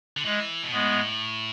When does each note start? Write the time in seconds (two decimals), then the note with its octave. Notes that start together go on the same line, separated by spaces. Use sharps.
0.17 D3
0.25 E3 G#3
0.63 B2
0.72 A2 G#3 B3